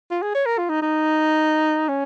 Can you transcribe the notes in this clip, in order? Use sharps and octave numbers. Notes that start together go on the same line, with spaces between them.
F4
G#4
C#5
A#4
F4
D#4
D#4
C#4